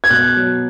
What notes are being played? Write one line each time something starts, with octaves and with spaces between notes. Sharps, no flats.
G#6
B2 F#6
F#3